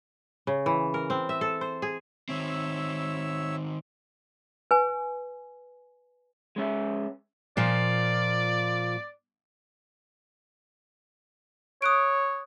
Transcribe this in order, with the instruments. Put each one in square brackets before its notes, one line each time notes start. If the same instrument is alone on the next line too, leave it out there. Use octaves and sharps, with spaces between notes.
[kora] C#3
E3
A#4
C4
E5
A4
C5
G#4
[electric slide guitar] D#3 C4 [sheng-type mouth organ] C#5 E5 E6
[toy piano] B4 G#5
[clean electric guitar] G#3 C#4 E5
[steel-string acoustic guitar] A#2 F3 F4 [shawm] D5
[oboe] C#5 [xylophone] D#6 F#6 D7